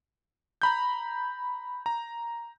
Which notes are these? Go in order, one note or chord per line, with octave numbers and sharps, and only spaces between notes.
A#5 B5 G6
A#5